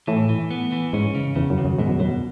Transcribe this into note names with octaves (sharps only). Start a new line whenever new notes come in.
A2 E3
E3
B3
E3
G#2 C#4
C#3
E2 C#3
F#2
D#2
F#2
G#2 B2
F#2
F#2 B2